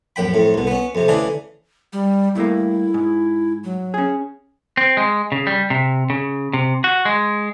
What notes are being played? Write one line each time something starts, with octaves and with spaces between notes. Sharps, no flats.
A#1 F#2 G5 B5
F2 A2
C2 B2
B3 C#4
F2 C3
D2 C#3 E3 D4 G#4
G3
G2 A3 A#3 E4
G#2
F#3
C#4 G#4
C4
G#3
C#3
G3
C3
C#3
C3
F#4
G#3